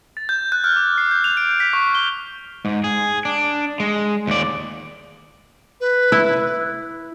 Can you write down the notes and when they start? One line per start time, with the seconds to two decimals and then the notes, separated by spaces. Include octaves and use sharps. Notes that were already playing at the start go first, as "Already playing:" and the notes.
0.17 A6
0.29 G6
0.52 F#6
0.64 F6
0.76 D6
0.98 C7
1.11 G6
1.24 F7
1.37 D7
1.60 B6
1.73 C#6
1.95 G7
2.65 G#2
2.84 G#4
3.25 D4
3.80 G#3
4.27 D#2 D5
5.81 B4
6.12 E4